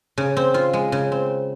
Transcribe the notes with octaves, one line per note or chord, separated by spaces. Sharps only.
C#3
C4
F4
G#3
C#3
C4